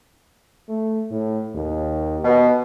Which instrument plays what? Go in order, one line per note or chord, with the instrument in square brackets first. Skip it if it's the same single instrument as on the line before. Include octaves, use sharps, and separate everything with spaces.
[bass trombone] A3
A2
D#2
[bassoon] B2 [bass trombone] B3